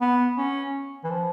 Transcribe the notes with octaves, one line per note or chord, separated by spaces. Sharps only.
B3
C#4
E3
F3